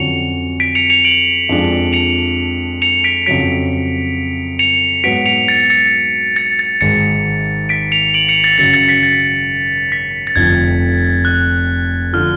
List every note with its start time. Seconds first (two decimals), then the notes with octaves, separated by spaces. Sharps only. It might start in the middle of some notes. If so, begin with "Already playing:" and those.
Already playing: F2 D3 F#3 C#4 F#4 C#7 F7
0.60 B6 D7
0.75 C#7 F7
0.90 C#7 F7
1.05 D7 F#7
1.49 F2 F3 G#3 D4
1.93 C#7 F7
2.82 C#7 F7
3.04 B6 D7
3.26 F2 C#3 F#3 B6 D7
4.59 C#7 F7
5.04 G#2 F#3 B3 F#4 B6 D7
5.26 C#7 F7
5.48 A6 C#7
5.70 A6 C#7
6.36 A6 C#7
6.59 A6
6.81 G#1 G#2 G#3 A6 C#7
7.69 B6 D7
7.92 C#7 F7
8.14 D7 F#7
8.29 C#7 F7
8.44 A6 C#7
8.58 F#2 C#3 F#3 A6 C#7
8.73 A6 C#7
8.89 B6
9.03 A6
9.92 B6
10.27 A6
10.36 F1 F2 D3 F3 G#6
11.25 F#6
12.13 D3 F3 F6